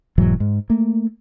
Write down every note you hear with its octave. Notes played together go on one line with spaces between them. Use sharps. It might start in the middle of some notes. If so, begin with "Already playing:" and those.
E1 G#2 E3 F#3
G#2
A3 A#3